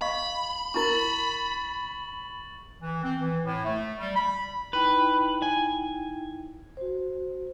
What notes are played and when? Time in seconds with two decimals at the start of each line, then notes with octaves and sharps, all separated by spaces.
0.01 D#5 F5 B5 C#6
0.74 D4 E4 A#4 C#6 A6 F#7
2.82 E3
3.04 C4
3.20 E3
3.44 A2
3.65 A3
3.99 G3
4.16 B5
4.73 D#4 E4 B4 G5
5.42 G#5
6.77 F#4 C5